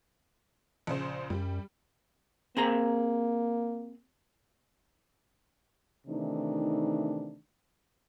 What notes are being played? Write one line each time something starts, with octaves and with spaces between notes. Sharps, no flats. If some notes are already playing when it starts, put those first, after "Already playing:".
A#1 C#3 C5
F#2 G3
A#3 C4 G#4 A#5
C3 D#3 E3 A3 D4 D#4